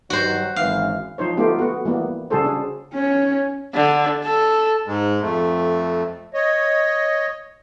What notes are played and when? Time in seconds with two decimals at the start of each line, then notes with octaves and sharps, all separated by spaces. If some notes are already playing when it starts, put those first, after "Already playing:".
0.10 G2 D#3 F#3 F#4 C5
0.56 G#1 F#2 E3 F5
1.18 F3 D#4 C5 C#5
1.37 A3 B3 D#4 F4 G4
1.59 B3 F#4
1.85 E3 G3 A#3 B3
2.30 C#3 G3 F#4 G#4 A4 C5
2.44 D4 G#4
2.94 C#4 C#5
3.74 D3
4.24 A4
4.87 G#2 G#3
5.22 F2 A3
6.34 C#5 D#5